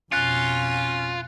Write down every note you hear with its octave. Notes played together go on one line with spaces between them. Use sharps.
F2 B2 C#4 F4 F#6 A6 C#7